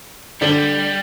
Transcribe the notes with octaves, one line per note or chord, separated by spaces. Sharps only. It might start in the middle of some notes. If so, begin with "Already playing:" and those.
D3 G3